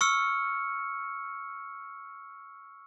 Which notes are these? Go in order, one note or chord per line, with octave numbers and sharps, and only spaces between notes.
C#6 E6 F6 C#7